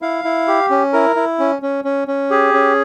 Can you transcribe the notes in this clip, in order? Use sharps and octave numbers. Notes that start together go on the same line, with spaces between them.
E4 F5
E4
G4
C#4
E4 A#4
E4
C#4
C#4
C#4
C#4
G4 G#4
C#4